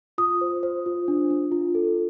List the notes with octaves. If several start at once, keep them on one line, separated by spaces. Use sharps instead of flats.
F4 D#6
C5
C5
F4
D4
D4
F4
A4